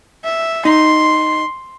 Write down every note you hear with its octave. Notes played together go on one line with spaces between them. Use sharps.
E5
D#4 C6